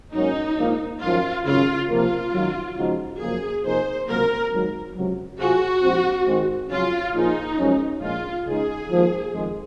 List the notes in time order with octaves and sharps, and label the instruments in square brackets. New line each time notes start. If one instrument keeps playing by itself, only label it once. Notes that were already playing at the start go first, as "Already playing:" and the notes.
[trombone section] G#2 F#3 A#3 C#4 [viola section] D#4
[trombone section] A#1 G#2 F3 A#3
[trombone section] G#1 F#2 F3 [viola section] F4
[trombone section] G#1 F#2 C#3 [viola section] F4
[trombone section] C3 F3 A#3 [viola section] F4
[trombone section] G#1 F#2 D#3 F#3
C#3 F3 G#3 D#4 F#4
[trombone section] F#2 C#3 F3 A#3 [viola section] G#4
[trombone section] C3 F3 A#3 D#4 G#4 [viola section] C5
[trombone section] C#2 C3 F#3 A#3 [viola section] A#4
[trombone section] G#1 G#2 D#3 F#3
C#2 C3 F#3
[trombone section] C3 F#3 C4 F4 G#4 [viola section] F#4
[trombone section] A#1 G#2 F3 C4
G#1 G#2 D#3 G#3 C4
[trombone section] F2 C#3 F#3 C#4 [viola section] F4
[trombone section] A#2 F3 A#3 F4 G#4 [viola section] D#4
[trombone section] F#2 F3 G#3 C#4
[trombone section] A#1 A#2 G#3 [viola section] F4
[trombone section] C#2 C#3 G#3 D#4 [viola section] G#4
[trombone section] G#1 G#2 F3 A#3
F2 D#3 G#3